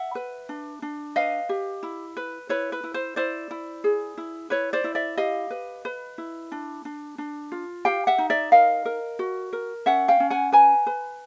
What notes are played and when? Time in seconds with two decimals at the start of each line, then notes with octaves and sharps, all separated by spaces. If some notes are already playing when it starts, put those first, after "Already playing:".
Already playing: E5 F#5
0.15 B4
0.49 D4
0.82 D4
1.16 B4 D#5 F5
1.49 G4
1.83 E4
2.17 B4
2.49 E4 B4 C#5
2.72 B4
2.84 E4
2.94 C5
3.16 E4 C5 D5
3.51 E4
3.84 G#4
4.18 E4
4.50 E4 B4 C#5
4.73 C5 D5
4.84 E4
4.95 D5 E5
5.17 G4 D#5 F5
5.50 B4
5.85 B4
6.18 E4
6.52 D4
6.85 D4
7.18 D4
7.52 F4
7.85 G4 F5 G5
8.07 E5 F#5
8.18 D#4
8.30 D5 E5
8.52 A#4 D#5 F5
8.85 A#4
9.19 F#4
9.53 A#4
9.86 C#4 E5 F#5
10.08 F5 G5
10.20 C#4
10.30 F#5 G#5
10.52 B4 G#5 A#5
10.87 B4